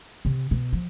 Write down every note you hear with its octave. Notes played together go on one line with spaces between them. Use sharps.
C3
B2
F3